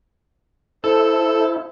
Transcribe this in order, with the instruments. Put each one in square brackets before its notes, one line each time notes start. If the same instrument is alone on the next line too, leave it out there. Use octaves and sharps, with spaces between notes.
[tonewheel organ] E4 [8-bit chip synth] A4 [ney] C5